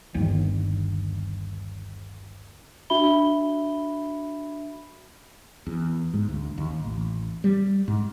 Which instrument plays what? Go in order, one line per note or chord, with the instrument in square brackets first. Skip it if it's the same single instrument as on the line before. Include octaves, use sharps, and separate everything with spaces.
[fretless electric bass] G1 D#2
[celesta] D4 F#4 E5 B5 G7
[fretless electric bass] E2
G#2
D2
D#2
A1
G3
G#2